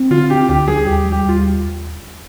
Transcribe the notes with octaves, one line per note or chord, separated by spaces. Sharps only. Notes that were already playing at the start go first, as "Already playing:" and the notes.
Already playing: C4
D3 F4
D4 G4
D2 G4
G3 G#4
D#2 G4
G3
G4
D#2 F4